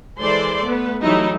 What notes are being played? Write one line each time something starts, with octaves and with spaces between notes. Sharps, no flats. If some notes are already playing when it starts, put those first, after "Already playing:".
E3 G#3 A4 C5 D5 C6
A3 B3 B4
E3 F#3 G3 A3 D#4 E4